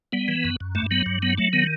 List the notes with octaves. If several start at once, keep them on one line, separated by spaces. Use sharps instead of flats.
G3 B3
E3
F#2
F#2
G2 A3
F#3 B3
G2
F#3 B3
F#3 A3
D#3 B3